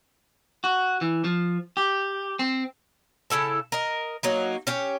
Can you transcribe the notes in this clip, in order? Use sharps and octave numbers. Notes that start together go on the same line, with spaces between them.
F#4
E3
F3
G4
C4
C#3 E4 A4 A5
A#4 D#5
F#3 A#3 D#4
C#4 G4 C#5